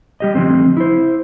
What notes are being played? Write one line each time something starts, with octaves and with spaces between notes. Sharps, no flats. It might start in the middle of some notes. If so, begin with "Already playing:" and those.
G3 G4 D#5
D3 F3 A3 C4
E4 C5